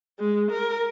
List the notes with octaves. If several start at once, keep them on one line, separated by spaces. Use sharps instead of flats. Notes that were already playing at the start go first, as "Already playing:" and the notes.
G#3
A#4